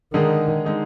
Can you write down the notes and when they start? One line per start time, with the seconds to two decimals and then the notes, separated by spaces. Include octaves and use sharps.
0.14 D3 D#3 G#3 D#4 G#4
0.65 D3 G#3 D#4 G#4